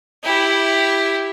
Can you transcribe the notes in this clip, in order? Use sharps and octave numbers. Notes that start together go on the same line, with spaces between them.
E4 G4